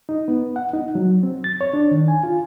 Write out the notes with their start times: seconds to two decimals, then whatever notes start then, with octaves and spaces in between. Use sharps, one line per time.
0.09 D#4
0.28 B3
0.56 F#5
0.74 D#4
0.95 F#3
1.23 C4
1.44 A6
1.61 C#5
1.74 D4
1.91 D#3
2.08 G#5
2.23 F4